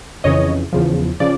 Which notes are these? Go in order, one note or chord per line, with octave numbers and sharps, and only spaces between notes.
F2 C#3 E3 C#5 D#5
E2 C#3 F3
C#3 F3 D5